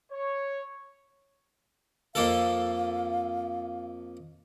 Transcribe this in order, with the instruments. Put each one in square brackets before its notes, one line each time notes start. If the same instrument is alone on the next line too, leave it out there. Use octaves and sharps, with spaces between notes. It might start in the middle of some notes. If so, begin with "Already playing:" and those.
[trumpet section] C#5
[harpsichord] F2 A#3 A4 [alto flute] F5